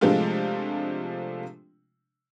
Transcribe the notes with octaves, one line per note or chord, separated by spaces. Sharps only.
C3 F3 G#3 A3 D4 F4